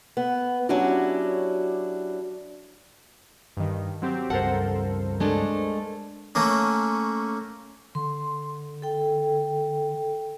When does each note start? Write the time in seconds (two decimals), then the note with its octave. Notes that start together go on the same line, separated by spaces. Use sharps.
0.17 B3
0.69 F#3 C#4 D4 E4 F#4 G4
3.57 G2 D#3
4.02 F#3 C4 G4
4.30 C#2 G2 A4 A#4 C5 F#5
5.20 G#3 A3 D4
6.35 A3 A#3 C#4
7.95 D3 C6
8.82 A4 G5